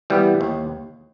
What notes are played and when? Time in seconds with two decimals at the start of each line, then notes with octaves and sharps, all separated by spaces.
0.10 E3 G3 B3
0.41 D#2